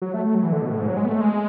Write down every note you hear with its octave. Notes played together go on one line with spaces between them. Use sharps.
F#3
A3
A3
F#3
E3
D3
B2
A2
G#2
F#3
G#3
B3
A3
G#3